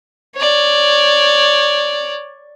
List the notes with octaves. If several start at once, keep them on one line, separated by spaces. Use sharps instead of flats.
C#5 D5